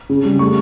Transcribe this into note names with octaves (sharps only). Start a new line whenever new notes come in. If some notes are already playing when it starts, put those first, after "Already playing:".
C#3
G3
A3 C#6